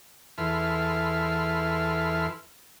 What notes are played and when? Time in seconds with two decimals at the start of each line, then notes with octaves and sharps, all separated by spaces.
0.38 E2 E4 A4 B4 C6 F6